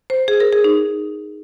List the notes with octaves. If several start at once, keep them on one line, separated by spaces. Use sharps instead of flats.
C5
G#4
A#4
G#4
D#4